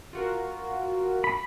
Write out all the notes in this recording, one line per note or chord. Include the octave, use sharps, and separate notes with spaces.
F4 F#4 A#4
B5